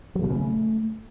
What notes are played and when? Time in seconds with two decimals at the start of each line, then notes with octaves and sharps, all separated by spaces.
0.15 F#3
0.22 B2
0.29 C#3
0.36 A3